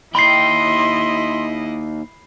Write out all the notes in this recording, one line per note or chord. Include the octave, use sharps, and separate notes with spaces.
D#2 E4 D#5 G5 B5 C6 C7